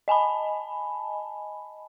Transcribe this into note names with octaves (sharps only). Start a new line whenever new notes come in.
D#5 G#5 A5 B5